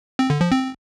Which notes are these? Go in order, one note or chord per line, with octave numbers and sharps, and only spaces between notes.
C4
D3
F3
C4